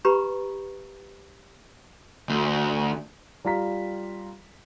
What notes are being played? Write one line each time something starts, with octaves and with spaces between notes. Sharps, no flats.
G4 B4 A#5 B5 C#6
D2
G3 F4 A#5 B6